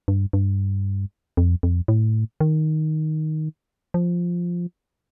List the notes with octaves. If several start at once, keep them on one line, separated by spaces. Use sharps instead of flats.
G2
G2
F2
F2
A2
D#3
F3